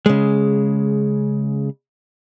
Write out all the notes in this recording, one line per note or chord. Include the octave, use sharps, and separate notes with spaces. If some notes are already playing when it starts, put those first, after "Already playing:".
C#3 G#3